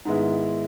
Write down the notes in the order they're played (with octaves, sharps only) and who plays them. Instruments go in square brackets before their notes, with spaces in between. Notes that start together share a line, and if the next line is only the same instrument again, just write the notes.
[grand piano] G#2 D#3 G#3 B3 E4